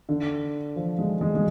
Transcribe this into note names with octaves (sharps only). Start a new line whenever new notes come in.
D3
F3
G#3
G#3
G#3